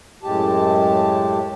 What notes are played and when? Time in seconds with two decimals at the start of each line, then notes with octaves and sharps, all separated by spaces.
0.23 F#2 A2 G#3 G4 A5